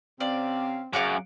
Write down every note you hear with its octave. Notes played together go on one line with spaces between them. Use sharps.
C3 C4 C#4 D5 F5
F#2 C#3 F5 F#5 D6